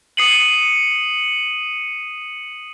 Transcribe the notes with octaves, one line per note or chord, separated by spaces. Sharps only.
D#6 C7 C#7 D#7 F#7